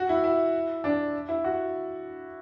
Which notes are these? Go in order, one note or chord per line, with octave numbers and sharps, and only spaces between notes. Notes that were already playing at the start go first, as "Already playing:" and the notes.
Already playing: F#4
E4
E4
D4
E4
F#4